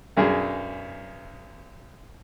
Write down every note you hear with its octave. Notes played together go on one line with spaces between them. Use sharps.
B1 F#2 D4 G#4